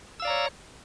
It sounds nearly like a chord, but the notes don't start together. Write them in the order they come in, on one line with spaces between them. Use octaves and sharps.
E6 F5 D5 A#5 C#5